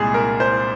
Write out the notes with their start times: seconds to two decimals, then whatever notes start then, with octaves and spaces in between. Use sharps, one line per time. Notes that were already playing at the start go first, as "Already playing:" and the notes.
Already playing: C2 A#2 G#3 G#4
0.14 A#4
0.40 C5